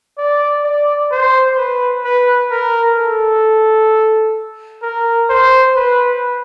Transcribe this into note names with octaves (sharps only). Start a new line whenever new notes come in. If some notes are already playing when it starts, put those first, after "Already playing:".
D5
D5
C5
B4
B4
A#4
A4
A#4
C5
B4